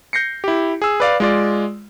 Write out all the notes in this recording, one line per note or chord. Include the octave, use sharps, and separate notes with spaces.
G6 A#6 C7 C#7
E4 G4
G#4 E6
B4 D5 F5
G#3 F4 D5